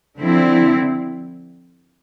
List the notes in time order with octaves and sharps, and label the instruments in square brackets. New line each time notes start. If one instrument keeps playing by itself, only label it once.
[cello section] D3 F3 C4 E4